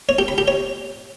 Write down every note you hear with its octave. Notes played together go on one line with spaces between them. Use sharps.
C#5
G4
B5
G4
C#5